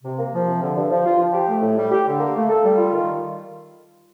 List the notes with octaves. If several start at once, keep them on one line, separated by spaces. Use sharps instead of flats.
C3
A#3
F3
C3
D3
G2
F3
F4
F3
G4
A3
A2
G3
G4
D3
A#3
A3
A4
G3
F4
D#3